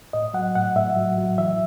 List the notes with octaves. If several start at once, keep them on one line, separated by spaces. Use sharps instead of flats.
A2 D#5
F#3 F#5
A2 F#5
A2 E5
F#3
F#3
E3 E5